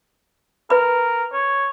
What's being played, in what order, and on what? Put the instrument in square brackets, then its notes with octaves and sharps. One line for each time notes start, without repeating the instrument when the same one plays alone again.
[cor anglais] A#4 [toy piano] B4 B5
[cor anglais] C#5